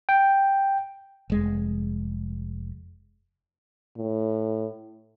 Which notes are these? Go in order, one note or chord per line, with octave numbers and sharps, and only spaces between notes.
G5
F1 G#3
A2